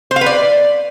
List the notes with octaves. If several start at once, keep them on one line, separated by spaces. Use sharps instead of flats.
C5
F5
B4
D5